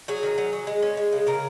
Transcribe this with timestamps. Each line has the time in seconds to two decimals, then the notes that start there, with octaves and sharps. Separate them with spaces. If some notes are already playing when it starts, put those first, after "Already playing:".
0.08 F#3 G#4
0.23 D#3
0.38 F#3
0.53 F#3
0.67 G#3
0.82 C#4
0.97 G#3
1.12 C#3
1.27 C#3 A#4